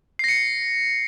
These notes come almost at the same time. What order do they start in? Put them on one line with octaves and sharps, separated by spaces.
C7 A#6 C#7